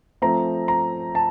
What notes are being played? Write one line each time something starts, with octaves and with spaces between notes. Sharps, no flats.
F3 A3 C4 A#5
A#5
A5